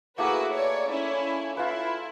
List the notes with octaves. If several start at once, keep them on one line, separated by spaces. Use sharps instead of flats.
A3 A#3 E4 F#4 G#4 B4
C#5 D5
C#4 E4
E4 F4 B4